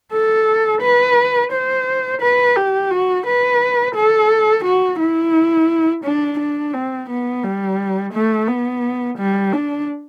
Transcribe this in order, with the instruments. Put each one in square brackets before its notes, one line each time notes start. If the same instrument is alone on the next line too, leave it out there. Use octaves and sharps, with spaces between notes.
[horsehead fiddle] A4
B4
C5
B4
G4
F#4
B4
A4
F#4
E4
D4
D4
C4
B3
G3
A3
B3
G3
D4